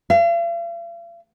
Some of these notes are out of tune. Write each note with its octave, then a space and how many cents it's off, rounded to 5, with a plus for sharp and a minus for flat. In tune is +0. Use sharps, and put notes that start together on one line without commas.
F5 -45